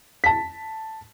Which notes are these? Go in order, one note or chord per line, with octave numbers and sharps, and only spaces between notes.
A5 B6